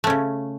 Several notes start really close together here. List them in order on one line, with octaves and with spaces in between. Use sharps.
A3 C#4 C#3